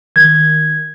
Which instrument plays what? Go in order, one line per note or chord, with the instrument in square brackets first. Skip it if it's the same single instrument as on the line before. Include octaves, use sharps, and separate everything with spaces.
[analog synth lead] D#3 [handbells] G#6